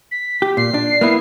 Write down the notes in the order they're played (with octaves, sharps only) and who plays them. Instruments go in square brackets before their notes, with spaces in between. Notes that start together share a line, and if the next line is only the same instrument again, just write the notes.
[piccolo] B6
[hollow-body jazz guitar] G4
[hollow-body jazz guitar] A#2 [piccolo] C7
[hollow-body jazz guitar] D4
A#3 B3 E4